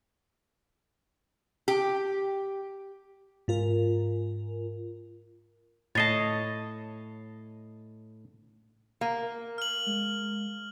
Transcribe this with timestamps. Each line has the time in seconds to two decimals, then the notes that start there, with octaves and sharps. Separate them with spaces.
1.68 G4
3.48 G#2 F4 A#4
5.95 A2 C#5 D#5 A5 A6 C7
9.01 A#3
9.22 A#4
9.58 F6 F#7
9.87 G#3